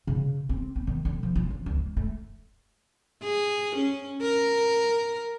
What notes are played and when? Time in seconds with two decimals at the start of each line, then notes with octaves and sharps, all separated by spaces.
0.07 C#3
0.49 C4
0.76 B3
0.87 D#3
1.05 D3
1.23 F3
1.35 F4
1.50 E3
1.66 C#2
1.79 G#3
1.97 A3
3.23 G#4
3.76 C#4
4.22 A#4